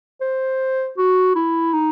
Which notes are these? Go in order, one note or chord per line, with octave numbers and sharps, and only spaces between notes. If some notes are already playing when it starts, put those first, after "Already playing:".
C5
F#4
E4
D#4